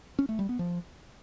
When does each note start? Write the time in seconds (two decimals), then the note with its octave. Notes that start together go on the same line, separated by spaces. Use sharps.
0.19 C#4
0.29 A3
0.39 G3
0.49 B3
0.59 F3